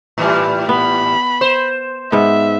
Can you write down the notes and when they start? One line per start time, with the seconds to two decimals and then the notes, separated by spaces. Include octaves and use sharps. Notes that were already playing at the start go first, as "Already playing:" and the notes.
0.18 A2 E3 G3
0.69 B3 B5
1.41 C5
2.12 G#2 B3 E5